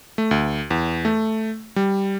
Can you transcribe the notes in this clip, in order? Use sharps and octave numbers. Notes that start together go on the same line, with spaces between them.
A3
D2
E2
A3
G3